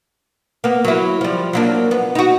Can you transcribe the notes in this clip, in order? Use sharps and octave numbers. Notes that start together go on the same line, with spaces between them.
A#3 B3
F#3 E4
F3 G3
F#3 A#3 D4
B3
D#4 F#4